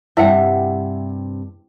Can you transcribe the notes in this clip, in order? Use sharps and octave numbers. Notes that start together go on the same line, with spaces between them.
G2 C3 E4 C5 E5 F#5 G5